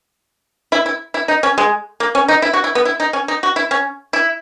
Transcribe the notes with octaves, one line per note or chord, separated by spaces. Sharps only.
E4
E4
E4
D#4
C#4
G#3
A#3
C#4
D#4
E4
F#4
E4
B3
E4
D#4
C#4
D#4
F#4
E4
C#4
E4